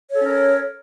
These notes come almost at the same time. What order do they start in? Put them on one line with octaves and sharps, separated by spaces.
C#5 A4 C#4 A#4